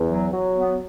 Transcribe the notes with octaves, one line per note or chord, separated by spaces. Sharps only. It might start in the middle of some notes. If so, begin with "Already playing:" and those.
Already playing: E2
F#3
F#3
B3